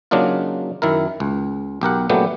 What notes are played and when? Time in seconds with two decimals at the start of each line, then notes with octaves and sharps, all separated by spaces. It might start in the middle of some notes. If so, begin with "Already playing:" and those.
0.11 C#3 F#3 A#3 D4 D#4 F4
0.82 F#2 D#3 E4 A#4
1.20 C#2
1.81 B1 G4 A#4 F#5
2.09 A#2 C#3 F#3 A3 B3 G4